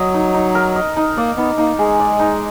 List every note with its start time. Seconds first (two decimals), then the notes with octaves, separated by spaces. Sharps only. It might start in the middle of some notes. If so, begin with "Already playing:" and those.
Already playing: F#3 D#5
0.14 D#4
0.34 D#4
0.55 A#4
0.76 D#5
0.97 D#4
1.17 A#3 D5
1.37 B3 D#4
1.58 A#3 D#4
1.79 G#3 G#4
2.00 D5
2.20 D#4